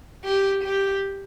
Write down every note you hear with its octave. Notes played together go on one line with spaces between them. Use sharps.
G4
G4